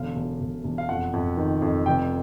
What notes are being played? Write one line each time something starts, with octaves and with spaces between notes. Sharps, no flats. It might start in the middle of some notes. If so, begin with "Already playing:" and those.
Already playing: E1 D3 F5
E1
E1
E1
F5
F2 F#5
F2
D#3
F2
F1 G5